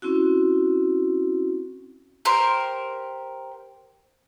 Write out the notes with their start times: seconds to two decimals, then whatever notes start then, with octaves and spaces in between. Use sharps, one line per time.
0.02 C4 C#4 E4 F#4
2.25 G4 A#4 C5